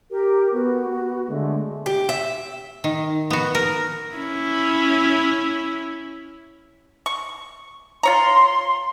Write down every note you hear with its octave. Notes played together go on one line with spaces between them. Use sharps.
G4 A#4
B3 F#4
B3
D3 G#3 A3
G4
E5
D#3
B3 F#4
A#4
C#4 E4
C#6
F4 C#5 A#5 C6